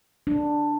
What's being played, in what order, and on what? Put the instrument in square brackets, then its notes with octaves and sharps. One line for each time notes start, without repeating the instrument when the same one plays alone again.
[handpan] D4